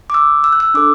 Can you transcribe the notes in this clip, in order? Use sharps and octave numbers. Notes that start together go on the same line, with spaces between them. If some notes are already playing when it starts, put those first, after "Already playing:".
D6
E6
E6
F#6
E6
D4 A4 D6